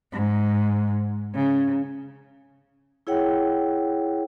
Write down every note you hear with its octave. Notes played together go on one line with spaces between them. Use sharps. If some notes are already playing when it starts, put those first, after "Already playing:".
G#2
C#3
E4 G#4 C#5 F#5 G5